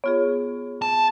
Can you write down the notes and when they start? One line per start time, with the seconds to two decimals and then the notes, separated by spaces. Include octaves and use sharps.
0.04 B3 F4 G#4 C#5
0.82 A5